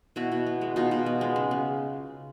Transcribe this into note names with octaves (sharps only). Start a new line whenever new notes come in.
B2 E4 F#4
B2
B3
G#3
B2 D#4 F4
B2
B3
G#3
C#3
C#3